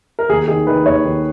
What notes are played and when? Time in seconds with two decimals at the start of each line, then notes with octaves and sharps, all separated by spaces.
0.19 A#4
0.29 D#2 G#4
0.48 D#3 G#4
0.67 D#3 B4
0.86 D#2 C#5
1.04 D#3